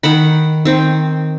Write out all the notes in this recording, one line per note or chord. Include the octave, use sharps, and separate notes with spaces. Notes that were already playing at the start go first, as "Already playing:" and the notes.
D#3 F#5 B5
D#3 C4